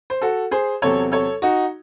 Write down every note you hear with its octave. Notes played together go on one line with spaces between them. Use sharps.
C5
F#4 A4
G#4 C5
E2 C3 F#3 C4 A4 C#5
A4 C#5
D#4 F#4